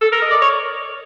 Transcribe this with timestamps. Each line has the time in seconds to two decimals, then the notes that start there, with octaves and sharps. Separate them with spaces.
0.01 A4
0.12 A#4
0.22 D#5
0.31 D5
0.42 C#5